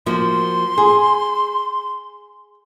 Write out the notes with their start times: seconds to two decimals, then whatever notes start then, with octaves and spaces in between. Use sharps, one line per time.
0.06 F3 A#3 F#4 C6
0.78 G#4